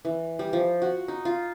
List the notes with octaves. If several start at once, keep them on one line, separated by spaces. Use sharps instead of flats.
E3
G3
F3
F#4
D#4
F4